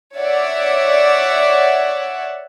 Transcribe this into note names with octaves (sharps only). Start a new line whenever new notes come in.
C#5 D5 E5 F#5